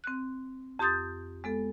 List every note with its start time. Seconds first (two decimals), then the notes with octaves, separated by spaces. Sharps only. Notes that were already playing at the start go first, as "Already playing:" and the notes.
0.04 C4 F#6
0.79 F2 G4 C6 D#6 G6 A6
1.44 G#3 B3 A4